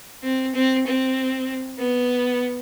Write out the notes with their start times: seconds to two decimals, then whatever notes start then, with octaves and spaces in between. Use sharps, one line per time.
0.23 C4
0.54 C4
0.86 C4
1.79 B3